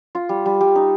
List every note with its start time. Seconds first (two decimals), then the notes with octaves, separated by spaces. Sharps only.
0.15 F4
0.29 G3
0.46 G3
0.61 G3
0.75 D#4